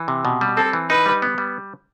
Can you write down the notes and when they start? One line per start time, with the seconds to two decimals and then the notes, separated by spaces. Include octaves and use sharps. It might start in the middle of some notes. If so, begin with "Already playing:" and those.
Already playing: E3
0.08 C3
0.25 B2
0.41 G3
0.57 C4 A4
0.73 E3
0.90 D#4 B4
1.06 G3
1.22 B3
1.38 G3